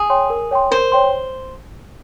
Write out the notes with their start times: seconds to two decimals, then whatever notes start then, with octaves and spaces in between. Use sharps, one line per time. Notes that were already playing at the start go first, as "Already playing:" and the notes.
Already playing: G#4
0.10 C#5 G5 C6
0.30 A#4
0.51 C#5 G5 C6
0.71 A#4 C5
0.92 C#5 G5 C6